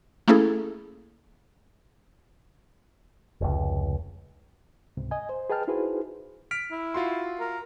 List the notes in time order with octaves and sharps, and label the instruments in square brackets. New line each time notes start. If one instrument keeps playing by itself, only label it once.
[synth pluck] A3 A#3 C#4 E4 G#4 A4
[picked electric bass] F1 C#2
[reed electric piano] C#2 G#2 C3
D#5 G#5
C5
G#4 B4 D#5 G5 A5 F6
D#4 E4 F#4 G#4 B4 C5
[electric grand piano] F6 B6 D7
[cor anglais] E4
[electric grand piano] F4 F#4 C6
[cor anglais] A#4